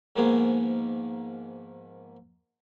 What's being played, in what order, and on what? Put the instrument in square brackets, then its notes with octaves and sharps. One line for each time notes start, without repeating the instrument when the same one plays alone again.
[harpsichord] G#2 D#3 F3 A#3 B3 G#4